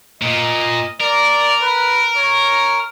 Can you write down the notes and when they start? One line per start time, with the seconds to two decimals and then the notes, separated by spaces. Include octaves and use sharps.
0.22 A#2 D#5
1.01 A#4 D5
1.63 B4
2.17 C#5